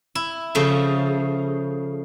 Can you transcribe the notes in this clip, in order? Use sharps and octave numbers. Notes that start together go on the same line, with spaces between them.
E4
C#3 F3 A3